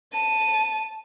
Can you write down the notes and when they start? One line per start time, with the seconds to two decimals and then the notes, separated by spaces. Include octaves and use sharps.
0.13 A5 D#7